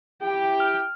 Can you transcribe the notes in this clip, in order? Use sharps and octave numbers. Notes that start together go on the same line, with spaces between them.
E4 G4 G5
F6